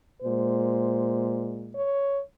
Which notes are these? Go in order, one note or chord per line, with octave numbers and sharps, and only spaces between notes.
A#2 G#3 C5
C#5